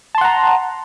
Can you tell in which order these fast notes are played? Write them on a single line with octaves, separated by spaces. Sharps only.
A5 C6 F#5 A#5